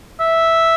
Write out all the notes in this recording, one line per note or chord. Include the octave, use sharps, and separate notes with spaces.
E5